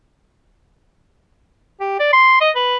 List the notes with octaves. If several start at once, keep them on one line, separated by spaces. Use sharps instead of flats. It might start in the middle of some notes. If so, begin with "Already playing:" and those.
G4
D5
C6
D#5
B4